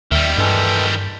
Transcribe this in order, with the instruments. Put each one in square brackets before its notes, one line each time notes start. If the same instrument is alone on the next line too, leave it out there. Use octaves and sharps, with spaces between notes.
[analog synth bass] D#2 [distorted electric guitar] D#3 G3 [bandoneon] E5
[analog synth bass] G2 [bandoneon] E3 G#3 A4